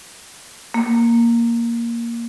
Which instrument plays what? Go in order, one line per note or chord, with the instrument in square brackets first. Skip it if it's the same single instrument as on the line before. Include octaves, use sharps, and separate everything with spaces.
[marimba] A#3